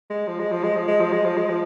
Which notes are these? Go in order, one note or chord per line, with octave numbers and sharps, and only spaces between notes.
G#3
F3
G#3
F3
G#3
F3
G#3
F3
G#3
F3
G#3
F3